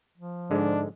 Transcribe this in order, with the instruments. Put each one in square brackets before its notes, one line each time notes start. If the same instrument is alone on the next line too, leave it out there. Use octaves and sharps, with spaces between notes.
[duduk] F3
[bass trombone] G#2 [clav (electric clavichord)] D3 G#3 [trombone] D4